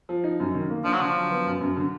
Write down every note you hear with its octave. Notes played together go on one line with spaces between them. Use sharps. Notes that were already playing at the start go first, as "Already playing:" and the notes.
F3
D#4
F#2
D#3
A#3
F3 D4
F#3
D3 F3
F#3
B3
F#2
F#2
D3